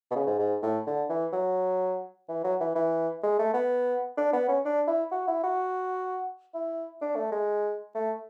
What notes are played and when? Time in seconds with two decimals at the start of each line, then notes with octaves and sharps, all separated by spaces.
0.11 B2
0.15 C#3
0.27 G#2
0.39 G#2
0.62 A2
0.87 D3
1.09 E3
1.33 F#3
2.28 E3
2.44 F#3
2.60 E3
2.75 E3
3.23 G#3
3.39 A3
3.53 B3
4.17 D4
4.33 B3
4.48 C#4
4.65 D4
4.87 E4
5.12 F#4
5.27 E4
5.43 F#4
6.54 E4
7.01 D4
7.16 A3
7.32 G#3
7.95 A3